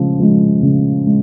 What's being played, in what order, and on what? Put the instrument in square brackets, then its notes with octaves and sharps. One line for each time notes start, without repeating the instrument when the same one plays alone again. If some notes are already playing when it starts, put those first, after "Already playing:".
Already playing: [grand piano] C#3 F3 G#3
F3 G#3
C#3
G#3